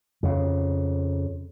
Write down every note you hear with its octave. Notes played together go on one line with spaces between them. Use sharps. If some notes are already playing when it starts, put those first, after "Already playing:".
F2 C#3